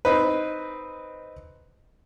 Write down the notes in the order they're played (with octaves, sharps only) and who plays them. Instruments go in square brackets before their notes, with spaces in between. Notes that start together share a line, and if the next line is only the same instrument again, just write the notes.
[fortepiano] C4 D#4 B4